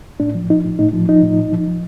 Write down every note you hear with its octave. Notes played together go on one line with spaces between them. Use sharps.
A2 D4
F3
F3 D#4
A2
A2 D#4
F3
F3 D#4
A2
A#2
F3
F3